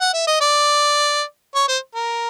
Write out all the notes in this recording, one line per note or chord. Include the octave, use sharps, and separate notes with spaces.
F#5
E5
D#5
D5
C#5
C5
A#4